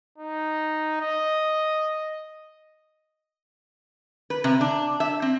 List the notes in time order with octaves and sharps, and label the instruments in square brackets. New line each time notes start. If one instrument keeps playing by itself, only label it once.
[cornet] D#4
D#5
[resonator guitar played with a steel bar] B4
C3
D4
E5
C4